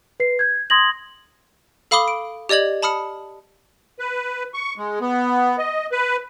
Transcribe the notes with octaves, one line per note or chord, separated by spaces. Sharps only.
B4 C7
G6 G#6
C6 D#6 G#6 A#6 F#7
A4 F5 B5 D6 D#6 G7
D7
G4 D5 D#5 G#6 F#7
A5 B5 D#6 F6 C#7
B4
C#6
G#3
B3
D#5
B4